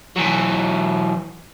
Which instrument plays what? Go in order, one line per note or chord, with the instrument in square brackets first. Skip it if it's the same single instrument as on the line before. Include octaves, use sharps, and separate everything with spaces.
[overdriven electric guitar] E3 F#3